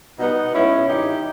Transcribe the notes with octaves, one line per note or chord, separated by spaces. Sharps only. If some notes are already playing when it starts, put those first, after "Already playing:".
B2 G3 B3 D#4
B2 G#3 C#4 E4
G2 D#3 G3 D#4 G4